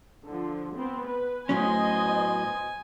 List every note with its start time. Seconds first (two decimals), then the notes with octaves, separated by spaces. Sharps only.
0.24 D3 F3
0.75 B3 C4
1.05 B4
1.49 A2 F#3 B3 C#4 C5 D#5 G#5